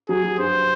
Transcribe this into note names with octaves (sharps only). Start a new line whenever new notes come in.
F#3 G#4
F#3
G2 C5